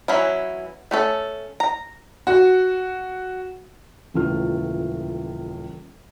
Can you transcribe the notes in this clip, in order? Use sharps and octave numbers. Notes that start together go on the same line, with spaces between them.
E3 F#3 C#4 E4
A3 C#4 A4
A#5
F#4
D#1 C#2 E3 A3 F4 F6